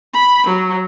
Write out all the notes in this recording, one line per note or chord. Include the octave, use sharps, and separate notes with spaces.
B5
F#3